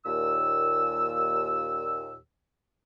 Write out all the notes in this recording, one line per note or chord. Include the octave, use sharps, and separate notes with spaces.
D#2 A#2 E6